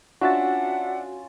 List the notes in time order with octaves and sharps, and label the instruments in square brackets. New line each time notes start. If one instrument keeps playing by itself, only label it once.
[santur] C#4 F4 E6 [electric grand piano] D4 E5 A6 [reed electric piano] F#4 [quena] F#5